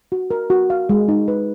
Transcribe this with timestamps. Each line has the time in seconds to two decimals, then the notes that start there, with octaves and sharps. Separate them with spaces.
0.12 F#4
0.31 A#4
0.50 F#4
0.70 F5
0.89 G#3
1.08 D#4
1.28 B4